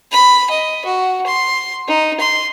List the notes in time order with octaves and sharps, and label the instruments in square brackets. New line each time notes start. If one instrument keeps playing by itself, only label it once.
[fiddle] B5
D#5
F#4
C6
D#4
C6